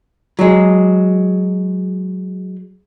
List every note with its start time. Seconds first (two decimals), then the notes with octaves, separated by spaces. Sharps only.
0.39 F#3 G#3